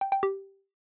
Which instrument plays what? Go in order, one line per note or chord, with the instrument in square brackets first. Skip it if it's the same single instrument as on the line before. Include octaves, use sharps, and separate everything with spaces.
[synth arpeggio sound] G5
G5
G4